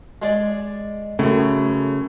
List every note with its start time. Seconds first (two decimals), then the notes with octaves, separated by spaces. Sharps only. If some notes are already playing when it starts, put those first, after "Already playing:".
0.22 G#3 G#4 D5
1.19 F#2 A2 C#3 A3